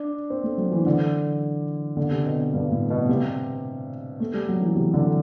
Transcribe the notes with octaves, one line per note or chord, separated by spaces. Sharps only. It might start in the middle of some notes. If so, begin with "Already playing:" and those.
Already playing: D4
C4
A3
F#3
E3
D3
D3
C3
B2
G2
A2
B2
C3
A3
G3
F#3
E3
C3
D3